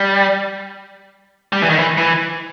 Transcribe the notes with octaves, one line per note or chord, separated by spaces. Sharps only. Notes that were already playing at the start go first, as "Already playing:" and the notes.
Already playing: G3
G3
E3
D#3
E3
E3